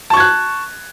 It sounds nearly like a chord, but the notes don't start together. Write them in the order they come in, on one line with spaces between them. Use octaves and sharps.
A5 C#6 G#6 F#6